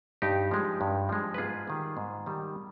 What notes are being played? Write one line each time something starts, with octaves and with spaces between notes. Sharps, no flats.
G2 D#4 G4
F3 G#3
G2
F3 G#3
B4
G#2 F4 G#4
D#3 G3
G#2
D#3 G3